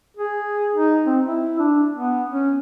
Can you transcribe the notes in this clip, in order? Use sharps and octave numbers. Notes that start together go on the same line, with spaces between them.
G#4
D#4
C4
E4
D4
B3
C#4